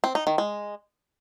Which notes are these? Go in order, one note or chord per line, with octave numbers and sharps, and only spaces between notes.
C4
D#4
D#3
G#3